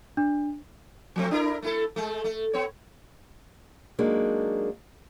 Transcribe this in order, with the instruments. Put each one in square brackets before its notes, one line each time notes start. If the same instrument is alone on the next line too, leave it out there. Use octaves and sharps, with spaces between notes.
[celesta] D4
[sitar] F3 A3 C4
D4 E4 A#4
A3 E4 A4
G#3 A3
A3
B3 C#5
[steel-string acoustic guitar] F#3 G#3 A#3 D4 D#4